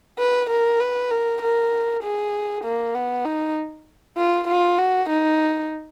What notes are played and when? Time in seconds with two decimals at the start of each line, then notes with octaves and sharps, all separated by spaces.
0.18 B4
0.50 A#4
0.80 B4
1.11 A#4
1.42 A#4
2.03 G#4
2.64 A#3
2.95 B3
3.25 D#4
4.17 F4
4.48 F4
4.78 F#4
5.09 D#4